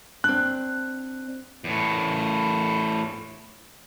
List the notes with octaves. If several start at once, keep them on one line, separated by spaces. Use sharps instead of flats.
C4 D4 F#6
E2 A2